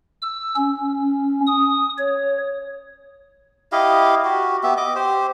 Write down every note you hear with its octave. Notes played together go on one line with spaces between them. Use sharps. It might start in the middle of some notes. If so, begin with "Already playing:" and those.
E6
C#4
D#6
C#5
E4 G4 D#5 F5
F#4 G4
B3 G4 E5
D#5 D6
G4 C5